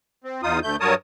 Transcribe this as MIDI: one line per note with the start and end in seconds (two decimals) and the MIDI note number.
0.24 0.41 60
0.43 0.59 40
0.43 0.59 63
0.43 0.59 65
0.43 0.59 87
0.63 0.76 38
0.63 0.76 57
0.63 0.76 91
0.80 0.94 43
0.80 0.94 54
0.80 0.94 70
0.80 0.94 73
0.80 0.94 81
0.80 0.94 87